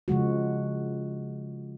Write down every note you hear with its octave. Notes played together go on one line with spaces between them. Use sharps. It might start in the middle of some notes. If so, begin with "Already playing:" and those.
C#3 F3 G#3 F#4